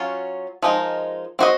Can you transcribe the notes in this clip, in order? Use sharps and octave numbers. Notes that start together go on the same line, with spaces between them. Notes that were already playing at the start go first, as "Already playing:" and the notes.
Already playing: F#3 C#4 F4
F3 G#3 D#4 A#4
C4 F#4 C5 D#5